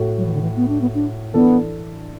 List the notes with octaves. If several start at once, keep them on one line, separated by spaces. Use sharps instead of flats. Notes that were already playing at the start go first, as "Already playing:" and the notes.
Already playing: A2 A3 F#4 A4
F#3
E3
D3
E3
B3
D4
B3
D4
E3 B3 D4 A4 D5